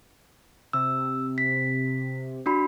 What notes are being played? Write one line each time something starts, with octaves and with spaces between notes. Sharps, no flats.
C3 E6
B6
D4 F#4 B5